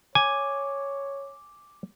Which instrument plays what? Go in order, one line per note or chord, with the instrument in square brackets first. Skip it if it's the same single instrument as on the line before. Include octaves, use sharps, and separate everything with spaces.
[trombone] C#5 [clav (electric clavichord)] G#5 [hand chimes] D6